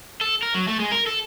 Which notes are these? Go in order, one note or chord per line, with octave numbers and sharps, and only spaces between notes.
A4
A#4
F#3
A3
G#3
A#4
A4